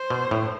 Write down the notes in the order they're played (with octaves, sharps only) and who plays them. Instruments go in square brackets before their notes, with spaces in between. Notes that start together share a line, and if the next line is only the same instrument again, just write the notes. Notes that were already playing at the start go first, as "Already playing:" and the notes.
Already playing: [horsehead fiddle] C5
[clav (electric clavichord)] B2
A2